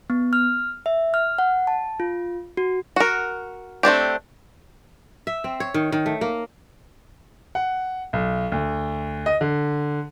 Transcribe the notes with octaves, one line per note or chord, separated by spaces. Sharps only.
B3
F6
E5
F6
F#5
A5
F4
F#4
F#4 A#4
A3 C4 D4 G4
E5
C4
C#5
D#3
D#3
A3
A#3
F#5
B1
D2
D#5
D3